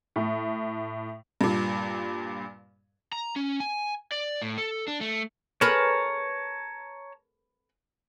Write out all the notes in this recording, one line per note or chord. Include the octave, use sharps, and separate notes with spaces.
A2
G2 A#2
A#5
C#4
G#5
D5
A2
A4
D4
A3
G#4 A#4 B4 C#5 A5 A#5